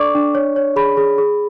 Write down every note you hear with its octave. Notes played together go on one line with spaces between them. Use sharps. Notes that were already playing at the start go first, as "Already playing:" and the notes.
Already playing: D4 A4 D5 C#6 D6
D4
C#5
C#5
G#4 B5
G#4
G#4